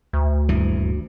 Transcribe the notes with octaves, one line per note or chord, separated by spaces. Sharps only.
D2
D#1 G2 E3